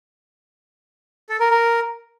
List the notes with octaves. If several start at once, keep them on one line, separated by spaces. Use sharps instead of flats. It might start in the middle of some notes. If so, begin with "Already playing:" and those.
A4
A#4
A#4